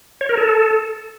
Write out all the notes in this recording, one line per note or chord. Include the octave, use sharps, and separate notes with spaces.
C#5
A#4
A4